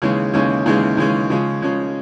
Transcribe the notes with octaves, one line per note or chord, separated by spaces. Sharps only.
D#2 C#3 E3 G#3 C#4
D#2 C#3 E3 G#3 C#4
D#2 C#3 E3 G#3 C#4
D#2 C#3 E3 G#3 C#4
C#3 F3 G#3 C#4
C#3 F3 G#3 C#4